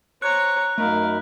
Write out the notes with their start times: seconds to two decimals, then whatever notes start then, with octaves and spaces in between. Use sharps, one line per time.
0.22 C5 C#5 A#5 F#6 C#7
0.78 F#2 A3 D#4 A#4 F5 B5